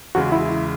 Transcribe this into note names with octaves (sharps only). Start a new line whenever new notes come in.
E2 C#3 G#3 F#4
E4